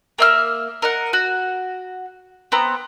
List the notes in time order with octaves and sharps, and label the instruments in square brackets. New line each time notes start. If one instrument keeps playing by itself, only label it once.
[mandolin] A#3 E5 F6
A#4 D#5 F#5
F#4
B3 C4 A#5